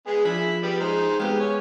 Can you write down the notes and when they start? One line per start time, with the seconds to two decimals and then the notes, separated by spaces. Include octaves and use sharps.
0.07 G#3 B3 G#4
0.25 F3 D4 G#4 E5 B5
0.63 G3 B3 D5
0.80 G#3 D#4 C5
1.20 G#3 B3 C4 G4 F5
1.40 C#5 G#5